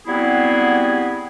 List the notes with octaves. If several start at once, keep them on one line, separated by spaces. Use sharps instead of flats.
F#3 G3 B3 C4 E4 G#4